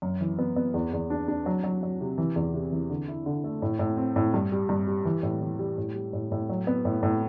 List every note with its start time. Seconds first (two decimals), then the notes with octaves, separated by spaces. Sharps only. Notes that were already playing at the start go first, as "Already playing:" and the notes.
0.02 F#2
0.21 E3
0.39 B3
0.56 B3
0.74 E2
0.93 E2
1.10 D4
1.28 D4
1.46 F#3
1.64 F#3
1.83 F#3
2.01 C3
2.18 E3
2.36 E2
2.54 C3
2.72 E3
2.90 D3
3.08 E4
3.26 D3
3.44 A3
3.62 A2
3.79 A2
3.97 C4
4.16 A2
4.34 G2
4.52 G3
4.69 G2
4.87 G3
5.05 E3
5.23 A2
5.41 E3
5.59 G3
5.78 A2
5.95 G3
6.13 A2
6.32 A2
6.49 F#3
6.67 B3
6.85 A2
7.03 A2